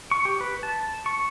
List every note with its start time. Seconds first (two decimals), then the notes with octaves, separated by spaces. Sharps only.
0.11 C#6
0.25 G4
0.41 B4
0.63 A5
1.06 C#6